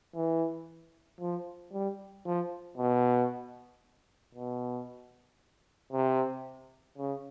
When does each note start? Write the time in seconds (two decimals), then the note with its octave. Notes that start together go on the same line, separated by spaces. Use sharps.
0.15 E3
1.21 F3
1.73 G3
2.25 F3
2.77 B2
4.35 B2
5.92 C3
6.98 C#3